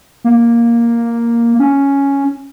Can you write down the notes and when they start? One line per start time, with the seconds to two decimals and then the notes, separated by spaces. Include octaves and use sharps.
0.24 A#3
1.59 C#4